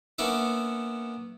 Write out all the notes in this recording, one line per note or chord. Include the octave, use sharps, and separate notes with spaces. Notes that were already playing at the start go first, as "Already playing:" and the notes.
A#3 B3 C#4 D4 E5